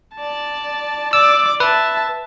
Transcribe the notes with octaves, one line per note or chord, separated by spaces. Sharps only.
D5 A5
D5 D6 E6
B4 E5 A5